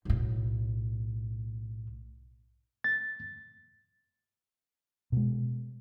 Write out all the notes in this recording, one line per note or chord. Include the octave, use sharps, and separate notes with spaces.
B1 A2
A6
B2 G#3